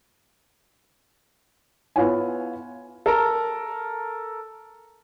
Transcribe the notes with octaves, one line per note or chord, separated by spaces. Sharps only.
B3 E4 F4 C#5 G#5
A4 A#4 A#5